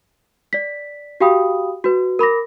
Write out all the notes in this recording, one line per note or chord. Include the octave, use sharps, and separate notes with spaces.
D5 B6
F#4 G4 F5 G5 B5 D#6
F#4 B4
A#4 B5 D6 A#6